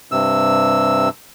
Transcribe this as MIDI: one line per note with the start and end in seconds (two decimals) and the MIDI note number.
0.12 1.09 43
0.12 1.09 48
0.12 1.09 88